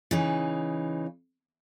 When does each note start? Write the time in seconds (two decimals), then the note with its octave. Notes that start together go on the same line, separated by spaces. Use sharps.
0.11 C#3 E3 D#4